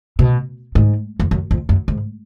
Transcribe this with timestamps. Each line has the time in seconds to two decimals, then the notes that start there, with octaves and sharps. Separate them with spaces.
0.19 B2
0.75 G#2
1.20 F2
1.31 F#2
1.51 F2
1.69 F#2
1.88 G#2